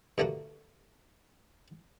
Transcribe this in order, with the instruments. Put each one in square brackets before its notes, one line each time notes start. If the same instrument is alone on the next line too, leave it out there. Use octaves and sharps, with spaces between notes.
[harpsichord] G2 D3 A3 A#3 F#4